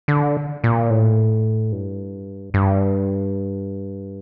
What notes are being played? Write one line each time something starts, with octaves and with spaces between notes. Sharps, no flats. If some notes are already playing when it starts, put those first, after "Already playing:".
D3
A#2
A2
G2
G2